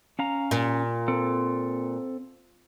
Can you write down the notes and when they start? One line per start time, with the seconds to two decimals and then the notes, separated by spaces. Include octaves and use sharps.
0.19 C#4 F5 A#5
0.51 A#2
1.08 C4 A4